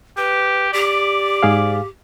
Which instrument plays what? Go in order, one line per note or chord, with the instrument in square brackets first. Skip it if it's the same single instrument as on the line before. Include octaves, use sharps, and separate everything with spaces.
[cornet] G4 [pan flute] B4
[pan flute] G4 [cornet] D5
[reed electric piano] G#2 G#4 F5